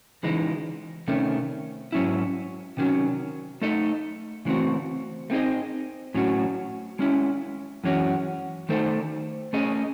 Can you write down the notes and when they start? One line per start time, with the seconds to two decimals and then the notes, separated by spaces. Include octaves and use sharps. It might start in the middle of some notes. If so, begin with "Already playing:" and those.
0.23 C#3 E3 G#3 D#4
1.08 C3 D#3 A3 C#4
1.92 G#2 F#3 C#4 E4
2.77 C3 D#3 F#3 C#4
3.62 A3 D#4 A4 D#5
4.45 C#3 E3 A3 C4 F#4
5.30 A3 C4 D#4 G#4 D#5
6.14 A2 F#3 C#4 F#4
6.99 G#3 C#4 E4
7.84 F#2 E3 G#3 C#4 F#4
8.69 D#3 A3 D#4 A4 C5
9.53 A3 C#4 G#4 D#5